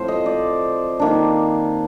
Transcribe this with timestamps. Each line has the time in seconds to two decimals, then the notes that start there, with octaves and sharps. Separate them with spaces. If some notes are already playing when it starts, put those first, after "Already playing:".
Already playing: A2 F3 C4 C5
0.08 D#5
0.26 D5
1.00 D#3 A#3 D4